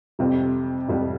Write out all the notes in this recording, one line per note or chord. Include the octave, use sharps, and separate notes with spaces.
F2 C3 G3
F2 C3 G3